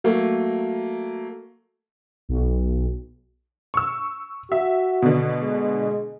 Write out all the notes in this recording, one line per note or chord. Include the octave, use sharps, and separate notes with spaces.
F#3 A3 A#3
B1
C#6 E6
F#4 E5
B2 D3
G#3